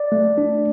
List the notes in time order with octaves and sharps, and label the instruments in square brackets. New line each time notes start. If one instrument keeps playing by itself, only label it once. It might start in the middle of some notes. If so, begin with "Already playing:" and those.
Already playing: [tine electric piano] D5
A3
D4